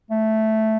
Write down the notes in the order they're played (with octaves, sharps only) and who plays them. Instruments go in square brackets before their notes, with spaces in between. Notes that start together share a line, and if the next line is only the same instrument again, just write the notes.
[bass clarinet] A3